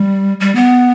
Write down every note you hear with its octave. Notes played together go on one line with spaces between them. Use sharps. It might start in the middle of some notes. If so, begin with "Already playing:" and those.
Already playing: G3
G3
B3